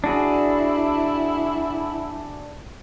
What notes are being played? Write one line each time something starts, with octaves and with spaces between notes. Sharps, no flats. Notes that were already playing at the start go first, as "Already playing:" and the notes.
D4 E4 F#4 G#4